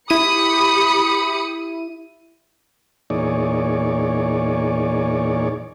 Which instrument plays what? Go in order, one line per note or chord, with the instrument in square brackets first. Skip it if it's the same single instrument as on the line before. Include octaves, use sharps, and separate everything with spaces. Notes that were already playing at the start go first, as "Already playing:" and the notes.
[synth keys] E4 D#7 [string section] G4 B5 C#7 [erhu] D#6
[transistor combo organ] E2 A#2 D#4 G#4 C#5 D5